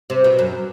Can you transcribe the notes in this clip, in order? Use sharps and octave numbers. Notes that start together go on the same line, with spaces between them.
C3
B2
F#2